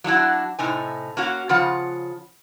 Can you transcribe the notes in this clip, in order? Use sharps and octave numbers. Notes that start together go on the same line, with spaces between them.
F#3 D4 E4 F#4
A2 C3 D#4 G#5
A#3 C#4 F#4
C#3 F3 F4 F#5